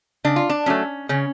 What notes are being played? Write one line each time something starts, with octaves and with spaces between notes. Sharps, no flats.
C#3 D4
F4
D4
F#3 A3 C#4
C#3 C#4